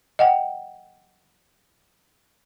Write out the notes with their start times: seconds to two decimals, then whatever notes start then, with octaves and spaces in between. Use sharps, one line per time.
0.19 D#5 F#5 G5